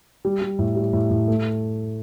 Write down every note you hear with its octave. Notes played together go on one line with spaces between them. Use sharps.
G3
G3
A2
G3
A2
A2
A3